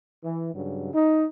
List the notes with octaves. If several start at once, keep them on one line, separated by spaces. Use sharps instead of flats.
E3
G2 C#3 F#3
D#4